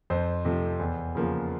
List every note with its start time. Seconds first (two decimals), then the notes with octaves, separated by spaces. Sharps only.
0.10 F2 C5
0.45 C3 F3 A3
0.79 E2
1.15 C#3 F3 A#3